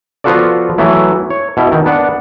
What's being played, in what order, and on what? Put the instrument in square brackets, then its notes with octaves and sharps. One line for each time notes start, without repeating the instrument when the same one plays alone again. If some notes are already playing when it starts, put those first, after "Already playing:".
[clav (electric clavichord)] F3 B3 F4 F#4 A4 D5
E3 F#3 A3 B3 E4
C#5
B2 E4
D#3
B3 D4 F#5